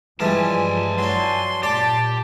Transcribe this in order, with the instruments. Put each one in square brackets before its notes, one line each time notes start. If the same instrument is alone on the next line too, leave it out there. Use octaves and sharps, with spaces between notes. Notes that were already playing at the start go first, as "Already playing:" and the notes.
[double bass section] G2 F3 [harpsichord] E3 G3 G#3 [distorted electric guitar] G#5 A5
[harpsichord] F#3 D4 [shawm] C6
[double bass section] A#2 [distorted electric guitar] G4 [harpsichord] D5 [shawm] A5